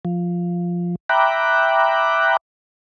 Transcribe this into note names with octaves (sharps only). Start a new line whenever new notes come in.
F3
E5 G5 A#5 B5 D6 F#6